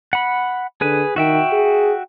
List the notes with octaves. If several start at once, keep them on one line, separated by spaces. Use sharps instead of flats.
F#5 B5
D3 G#4 B4 G#5
D#3 F#4 E5 G5
G#4